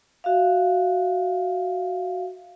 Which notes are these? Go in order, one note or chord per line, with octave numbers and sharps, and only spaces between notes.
F#4 E5 F5